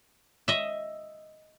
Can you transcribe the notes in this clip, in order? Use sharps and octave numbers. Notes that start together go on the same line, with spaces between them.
D#5 E5